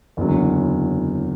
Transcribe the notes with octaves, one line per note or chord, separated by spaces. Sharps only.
F#1 E2 D3 F#3